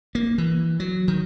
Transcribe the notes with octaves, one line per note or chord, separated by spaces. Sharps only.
A#3
E3
F#3
D#3